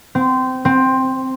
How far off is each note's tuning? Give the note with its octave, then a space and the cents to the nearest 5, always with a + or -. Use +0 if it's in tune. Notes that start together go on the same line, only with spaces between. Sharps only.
C4 -20
C4 +5